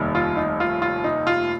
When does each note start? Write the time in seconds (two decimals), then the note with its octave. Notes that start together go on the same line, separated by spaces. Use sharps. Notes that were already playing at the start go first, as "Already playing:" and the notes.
Already playing: F1 D#2 D#3 G3
0.15 F4
0.37 D#4
0.60 F4
0.82 F4
1.04 D#4
1.27 F4